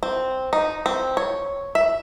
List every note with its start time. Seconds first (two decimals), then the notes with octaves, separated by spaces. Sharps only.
0.03 C4
0.53 D#4
0.86 C4
1.17 C#5
1.75 E5